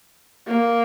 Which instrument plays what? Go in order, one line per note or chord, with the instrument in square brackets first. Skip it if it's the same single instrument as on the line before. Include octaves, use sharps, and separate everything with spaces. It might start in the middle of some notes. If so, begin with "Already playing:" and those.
[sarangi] A#3